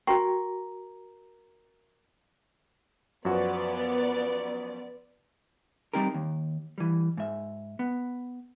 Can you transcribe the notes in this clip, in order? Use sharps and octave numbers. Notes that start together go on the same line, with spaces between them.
F#4 A#4 G5 C#6
F#2 F3 B3 F#4 D5
G3 C4 D#4 G4 A#4
D#2
E3 G3
G#2 E5
B3